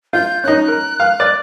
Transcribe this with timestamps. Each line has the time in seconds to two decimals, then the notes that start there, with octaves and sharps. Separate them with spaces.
0.13 F4 G6
0.44 C#4 D#4 F#6
0.68 A#4
1.00 F5
1.20 D5